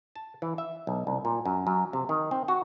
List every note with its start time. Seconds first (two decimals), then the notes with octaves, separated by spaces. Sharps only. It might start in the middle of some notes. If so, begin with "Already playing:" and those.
0.16 A5
0.42 E3
0.58 E5
0.87 B1
1.07 C2
1.25 A#2
1.46 F#2
1.67 F#2
1.93 C3
2.09 D#3
2.31 C4
2.48 F#4